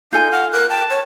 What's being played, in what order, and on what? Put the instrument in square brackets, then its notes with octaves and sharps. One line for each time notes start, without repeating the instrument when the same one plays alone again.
[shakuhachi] D#4 [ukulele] F4 A4 G#5 [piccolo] G6
[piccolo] F5 [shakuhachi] F#5
[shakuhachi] A#4 [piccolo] F#6
[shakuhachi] G5 [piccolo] A5
[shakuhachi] C#5